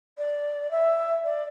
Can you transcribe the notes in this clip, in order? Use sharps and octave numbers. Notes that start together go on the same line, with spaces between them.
D5
E5
D5